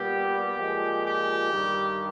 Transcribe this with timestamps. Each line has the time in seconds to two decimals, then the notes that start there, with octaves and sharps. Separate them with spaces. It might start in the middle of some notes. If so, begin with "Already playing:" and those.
Already playing: A#2 G3 B3 G4
0.54 A#2 F3 G#3
1.04 G4
1.52 G2 D#3 G3